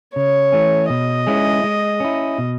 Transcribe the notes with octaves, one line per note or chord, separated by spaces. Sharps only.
C#3 C#5
E3 A3 C#4
B2 D#5
G#3 C#4 E4 G#4
G#3
C#4 E4
B2